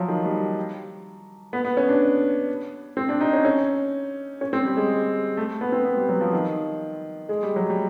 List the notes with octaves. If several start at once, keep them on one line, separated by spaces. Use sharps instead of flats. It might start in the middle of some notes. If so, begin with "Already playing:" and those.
Already playing: F3 F#3
D#3
G3
B3
B3
C#4
D4
C4
D4
D#4
C#4
C#4
C#4
C4
G3
G#3
A3
B3
C4
B3
G3
F#3
F3
D#3
G#3
G3
F#3
G3